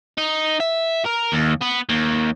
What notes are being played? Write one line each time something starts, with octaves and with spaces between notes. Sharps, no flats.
D#4
E5
A#4
D#2
B3
D#2